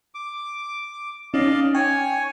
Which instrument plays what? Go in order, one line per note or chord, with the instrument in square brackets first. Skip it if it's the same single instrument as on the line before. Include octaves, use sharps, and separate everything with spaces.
[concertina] D6
[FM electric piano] C#4 D#4 [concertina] D5 D#5 F5
[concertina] C#5 G#5 [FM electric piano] G5